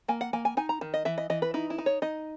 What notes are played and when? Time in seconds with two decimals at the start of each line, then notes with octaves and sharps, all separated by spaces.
0.08 A#3 G#5
0.21 F#5
0.33 A#3 G#5
0.45 G#5
0.57 D#4 G#5
0.69 A#5
0.81 D#3
0.94 D#5
1.05 E3 E5
1.18 D#5
1.30 E3 D#5
1.42 B4
1.54 D#4 E4
1.70 E4
1.78 D#4
1.86 C#5
2.02 D#4 D#5